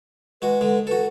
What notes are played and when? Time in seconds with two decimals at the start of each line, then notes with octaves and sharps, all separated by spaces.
0.42 G#3 F#4 B4
0.61 D3 G#3
0.87 F#4 A4 B4